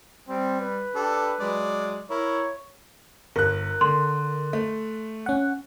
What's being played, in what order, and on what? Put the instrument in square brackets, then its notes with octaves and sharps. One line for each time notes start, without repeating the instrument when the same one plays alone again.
[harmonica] G3 [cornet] C4
[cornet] B4
[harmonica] D4 G4 A4
F#3 G#3 D5
[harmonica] E4 A#4 [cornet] C#5
[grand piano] G1 F#6 [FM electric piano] A#4
[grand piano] D3 [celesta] C6
[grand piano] A3
[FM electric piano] C#4 F#5